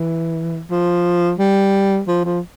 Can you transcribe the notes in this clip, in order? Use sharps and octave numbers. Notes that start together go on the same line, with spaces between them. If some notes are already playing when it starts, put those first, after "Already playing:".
Already playing: E3
F3
G3
F3
F3